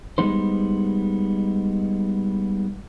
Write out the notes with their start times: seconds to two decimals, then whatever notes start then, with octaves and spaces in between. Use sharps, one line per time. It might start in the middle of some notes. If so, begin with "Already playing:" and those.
0.18 G3 G#3 B3 D#4 C5